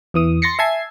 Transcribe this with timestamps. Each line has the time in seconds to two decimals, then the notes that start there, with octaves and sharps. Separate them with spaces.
0.14 E2 E3 D#6
0.42 C6 A6 A#6 C7 C#7
0.59 E5 G#5 A5 G#6 C7